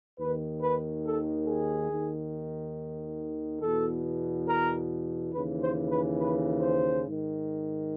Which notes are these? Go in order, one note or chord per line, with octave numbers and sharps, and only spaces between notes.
D#2 D#3 B4
B4
A4
G#4
D#2 D#3
E2 B2 A4
A#4
D#2 C#3 E3 B4
C5
B4
B4
C5
G#2 D#3